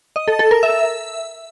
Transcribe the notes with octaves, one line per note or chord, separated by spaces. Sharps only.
D#5
A4
A4
A#4
E5